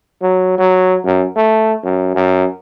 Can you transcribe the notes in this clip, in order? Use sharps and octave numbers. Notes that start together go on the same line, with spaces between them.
F#3
F#3
F#2
A3
F#2
F#2